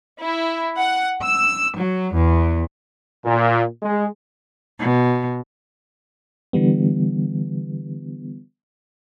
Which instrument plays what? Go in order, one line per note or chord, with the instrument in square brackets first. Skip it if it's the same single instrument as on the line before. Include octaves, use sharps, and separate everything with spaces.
[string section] E4
F#5
E6
F#3
E2
[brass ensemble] A#2
G#3
[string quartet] B2
[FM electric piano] D3 E3 G3 B3